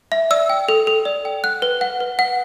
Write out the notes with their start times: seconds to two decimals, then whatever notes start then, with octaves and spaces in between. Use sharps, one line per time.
0.12 E5
0.31 D5 E6
0.50 G5
0.69 A4
0.87 A4
1.05 D5
1.25 G5
1.44 F#5 F#6
1.62 B4
1.81 F#5
2.00 B4
2.19 F#5